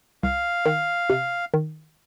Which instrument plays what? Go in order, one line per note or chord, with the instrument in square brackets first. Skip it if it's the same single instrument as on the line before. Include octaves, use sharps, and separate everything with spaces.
[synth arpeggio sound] C2 [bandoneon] F5
[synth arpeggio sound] D#3
C3
D#3